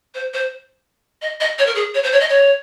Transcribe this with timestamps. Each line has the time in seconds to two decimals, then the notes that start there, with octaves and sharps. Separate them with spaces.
0.15 C5
0.34 C5
1.22 D#5
1.40 D#5
1.58 C#5
1.66 A#4
1.75 G#4
1.94 C#5
2.03 C5
2.12 C#5
2.20 D#5
2.29 C#5